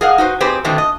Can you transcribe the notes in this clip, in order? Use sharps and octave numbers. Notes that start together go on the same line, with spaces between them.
G#4 A#4 D#5 F5 F#5
D#4 F#4 B4 C5
C4 D#4 G4 G#4 B4 C5
B2 D3 D#3 A3 B3 C4
D#5